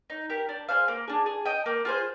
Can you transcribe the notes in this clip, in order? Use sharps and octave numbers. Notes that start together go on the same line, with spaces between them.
D#4
G4 A#4
D4
G#4 C5 F5
A#3
D4 G#4
G#4
D#5 G5
A#3
F4 G#4 C5